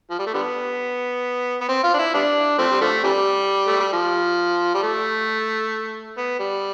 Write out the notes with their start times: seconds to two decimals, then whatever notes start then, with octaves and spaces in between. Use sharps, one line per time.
0.10 F3
0.19 G3
0.26 A3
0.34 D3 G3 B3
1.61 B3
1.69 C4
1.84 F4
1.94 D4
1.99 E4
2.14 G3 B3 D4
2.58 F3 A3 C4
2.71 G3
2.81 D3 F3 A3
3.04 C3 E3 G3
3.67 A3
3.80 G3
3.93 F3
4.74 G3
4.83 A3
6.17 B3
6.39 G3